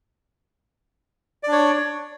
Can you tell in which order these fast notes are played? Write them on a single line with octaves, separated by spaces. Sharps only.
D5 D4 C#5